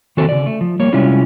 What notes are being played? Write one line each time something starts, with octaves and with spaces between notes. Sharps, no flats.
D#3 C4 F#4 A4 C5
C#3 D5
A3
F3
G3 A#3 C#5
C3 G3 G#3 C#4 E4 F4